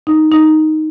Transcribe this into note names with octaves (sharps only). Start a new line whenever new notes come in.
D#4
D#4